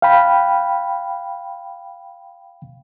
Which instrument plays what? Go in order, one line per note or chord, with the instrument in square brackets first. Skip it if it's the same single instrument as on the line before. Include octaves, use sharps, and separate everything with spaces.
[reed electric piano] F5 G5 B5